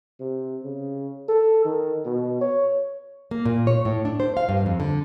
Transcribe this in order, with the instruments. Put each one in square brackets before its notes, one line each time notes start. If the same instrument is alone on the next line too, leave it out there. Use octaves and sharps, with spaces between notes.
[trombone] C3
C#3
A4
D#3
B2
C#5
[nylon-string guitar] A#3
A#2
C#5
A2
D4
C5
F5
G2
F2
D3